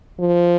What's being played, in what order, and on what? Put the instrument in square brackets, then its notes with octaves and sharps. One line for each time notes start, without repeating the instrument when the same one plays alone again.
[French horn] F3